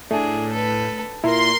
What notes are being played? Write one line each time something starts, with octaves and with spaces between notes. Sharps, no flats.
A2 A3 D4 G#4
A4 B4
A#2 E4 A#4 C6